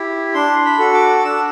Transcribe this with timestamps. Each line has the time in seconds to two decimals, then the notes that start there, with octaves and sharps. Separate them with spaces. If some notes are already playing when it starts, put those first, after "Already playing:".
Already playing: E4 G4
0.34 D4 C6
0.65 B5
0.79 F#4 A4
0.94 D6
1.19 D6
1.24 D4 E6